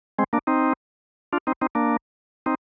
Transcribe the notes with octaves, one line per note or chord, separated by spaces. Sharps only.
G#3 C4
A#3 D4
C4 D#4
D4 F4
C4 D#4
C4 D#4
A#3 D4
C4 D#4